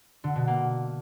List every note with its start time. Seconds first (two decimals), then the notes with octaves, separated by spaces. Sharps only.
0.24 D3
0.36 B2
0.48 A#3